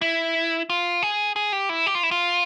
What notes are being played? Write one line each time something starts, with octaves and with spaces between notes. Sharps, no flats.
E4
F4
G#4
G#4
G4
E4
G4
F4
E4
F4